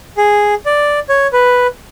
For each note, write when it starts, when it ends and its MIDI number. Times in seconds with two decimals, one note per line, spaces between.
0.17 0.54 68
0.66 0.99 74
1.09 1.27 73
1.33 1.67 71